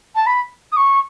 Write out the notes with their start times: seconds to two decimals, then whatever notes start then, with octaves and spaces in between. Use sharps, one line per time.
0.16 A5
0.26 B5
0.72 D#6
0.77 C#6